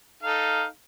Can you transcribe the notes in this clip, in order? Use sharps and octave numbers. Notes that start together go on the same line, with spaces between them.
D#4 A4 F5